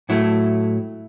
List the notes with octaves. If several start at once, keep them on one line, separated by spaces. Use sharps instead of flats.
A2 F#3 A3 E4